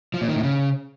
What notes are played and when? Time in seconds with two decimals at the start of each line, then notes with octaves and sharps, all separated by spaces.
0.14 F3
0.21 A#2
0.28 D#3
0.36 A2
0.43 C#3